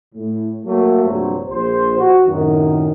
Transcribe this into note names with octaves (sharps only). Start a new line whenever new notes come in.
A2
F#3 A3 A#3
A#1 G2 C3 F#3 F#4 C5
A#1 C5
F#4
F#2 A2 C3 D#3